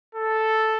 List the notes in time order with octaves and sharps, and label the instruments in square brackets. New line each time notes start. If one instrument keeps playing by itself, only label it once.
[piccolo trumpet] A4